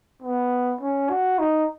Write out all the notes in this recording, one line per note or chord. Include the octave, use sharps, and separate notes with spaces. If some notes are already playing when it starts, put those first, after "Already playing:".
B3
C#4
F#4
D#4